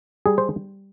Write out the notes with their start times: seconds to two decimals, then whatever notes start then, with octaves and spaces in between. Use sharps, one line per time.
0.26 G3 G#4
0.38 C5